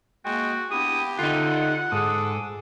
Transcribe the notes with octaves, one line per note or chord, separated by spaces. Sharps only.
G#3 A#3 F#4 G5
B3 D4 E4 G4 D#6
D3 D#4 F4 F#5
G#2 G#4 A4 D6 D#6